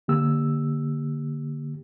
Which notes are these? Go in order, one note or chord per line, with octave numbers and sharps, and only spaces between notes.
D3 A#3 G4 E6